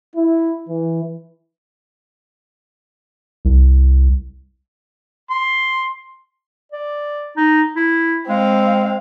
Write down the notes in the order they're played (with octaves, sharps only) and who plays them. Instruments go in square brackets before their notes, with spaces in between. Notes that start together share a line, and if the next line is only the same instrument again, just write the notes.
[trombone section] E4
E3
[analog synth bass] C2
[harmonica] C6
[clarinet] D5
D#4
E4
[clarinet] G#3 [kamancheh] C4 F5